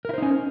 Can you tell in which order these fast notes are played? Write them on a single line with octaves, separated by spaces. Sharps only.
A#4 E4 C5 D#4 C#4